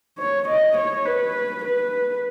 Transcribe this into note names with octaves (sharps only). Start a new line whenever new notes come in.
C#5
D#5
C#5
B4
B4